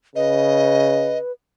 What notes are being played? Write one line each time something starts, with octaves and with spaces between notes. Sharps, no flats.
C#3 B4 D#5